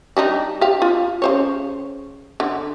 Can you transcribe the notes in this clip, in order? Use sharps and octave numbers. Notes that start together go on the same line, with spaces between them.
G3 D4 D#4
G4 F5
F4
C#3 C5 C#5
D3